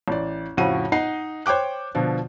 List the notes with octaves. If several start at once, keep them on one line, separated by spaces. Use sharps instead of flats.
A1 D5
F2 A2 C#3 F#4 F#5 D#7
D#4 D#5 F#5 C7
C5 C#5 G5 D6 F#6
B2 D3 F3